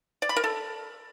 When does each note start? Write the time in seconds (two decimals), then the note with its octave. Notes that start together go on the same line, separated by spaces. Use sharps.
0.22 D5
0.29 B5
0.36 A#4
0.44 A4